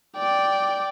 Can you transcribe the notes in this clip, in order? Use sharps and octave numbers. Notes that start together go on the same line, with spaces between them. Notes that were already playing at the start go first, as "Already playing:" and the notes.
D5 G5